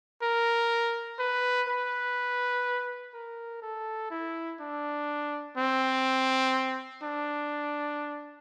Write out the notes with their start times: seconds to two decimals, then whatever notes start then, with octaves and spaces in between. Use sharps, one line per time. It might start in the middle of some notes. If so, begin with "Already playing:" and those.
0.23 A#4
1.19 B4
1.68 B4
3.14 A#4
3.62 A4
4.11 E4
4.60 D4
5.57 C4
7.03 D4